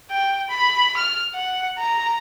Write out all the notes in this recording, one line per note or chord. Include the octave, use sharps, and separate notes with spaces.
G5
B5
F6
F#5
A#5